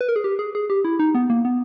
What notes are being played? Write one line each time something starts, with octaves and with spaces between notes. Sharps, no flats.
B4
A#4
G#4
G4
G#4
G#4
G4
E4
D#4
B3
A#3
B3